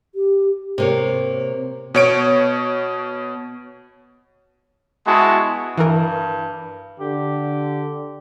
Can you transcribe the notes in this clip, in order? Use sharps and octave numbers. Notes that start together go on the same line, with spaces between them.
G4
C3 A#3 C#5
B2 C#5 D7
G#3 B3 E4 F#4 A5
G2 E3 A#4
D3 G4